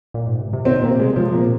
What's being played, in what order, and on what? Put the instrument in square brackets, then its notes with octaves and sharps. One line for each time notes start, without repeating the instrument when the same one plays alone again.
[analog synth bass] A#2
G#2
C3
C3
[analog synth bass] D#3 [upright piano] C4
[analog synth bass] A#2 [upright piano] A#3
[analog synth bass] C3
[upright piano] G#3
[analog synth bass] C3 [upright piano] F3
[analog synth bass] A#2 [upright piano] A#3